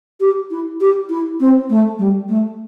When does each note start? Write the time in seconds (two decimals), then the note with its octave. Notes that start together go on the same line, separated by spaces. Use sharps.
0.20 G4
0.51 E4
0.80 G4
1.09 E4
1.40 C4
1.70 A3
1.99 G3
2.29 A3